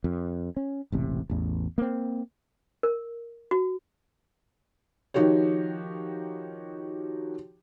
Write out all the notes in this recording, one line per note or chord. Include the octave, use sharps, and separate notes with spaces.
F2
C#4
E1 A1 C3
A1 E2
A#3 C4
A#4
F#4
D#3 F3 D#4 F#4 G4 C#5